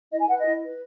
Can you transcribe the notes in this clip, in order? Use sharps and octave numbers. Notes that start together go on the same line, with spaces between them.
E4 D#5
G#5
B4 F#5
D#5
E4
B4